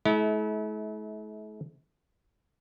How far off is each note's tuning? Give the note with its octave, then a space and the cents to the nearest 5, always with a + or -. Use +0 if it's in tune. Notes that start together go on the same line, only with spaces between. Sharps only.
A3 -45 E4 -30